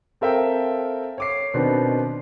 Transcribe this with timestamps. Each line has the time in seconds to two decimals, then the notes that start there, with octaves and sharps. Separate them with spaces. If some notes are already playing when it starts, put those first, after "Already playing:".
0.21 C4 A4 A#4 E5 F5 G5
1.18 C#5 D6 C7
1.54 B2 D#3 B3 C4 D4